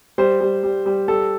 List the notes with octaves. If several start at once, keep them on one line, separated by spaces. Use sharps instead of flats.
G3 C5
G3
G3
G3
G3 A4